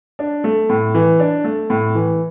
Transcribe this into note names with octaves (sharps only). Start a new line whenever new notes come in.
D4
A3
A2
E3
D4
A3
A2
E3